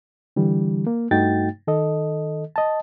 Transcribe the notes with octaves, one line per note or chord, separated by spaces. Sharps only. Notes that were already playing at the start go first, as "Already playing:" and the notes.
D3 E3 G3
A#3
G2 A3 D#4 F#4 G5 A6
D#3 A4 D#5
D#5 A5